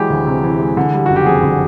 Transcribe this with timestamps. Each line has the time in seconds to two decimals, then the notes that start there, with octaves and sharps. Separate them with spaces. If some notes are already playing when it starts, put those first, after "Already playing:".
Already playing: E3 F#3 G#3 G4
0.10 D2
0.27 C3
0.43 E3
0.59 G#3
0.77 D3
0.94 G3
1.06 F#1 F#4
1.16 G4
1.26 F2 G#4
1.43 D3